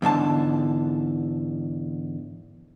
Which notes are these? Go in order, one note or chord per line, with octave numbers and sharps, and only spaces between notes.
E2 G#2 D3 A5